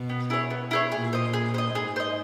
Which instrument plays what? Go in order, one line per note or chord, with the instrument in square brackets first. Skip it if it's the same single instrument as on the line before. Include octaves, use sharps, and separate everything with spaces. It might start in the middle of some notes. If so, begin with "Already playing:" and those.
Already playing: [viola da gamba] B2
[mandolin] B3
E4 G#4 C#5
B3
E4 G#4 C#5
[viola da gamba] A#2 [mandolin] G#4
[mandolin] C5 D#5
G#4
C5 D#5
[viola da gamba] G#2 [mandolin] G#4
[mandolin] C5 D#5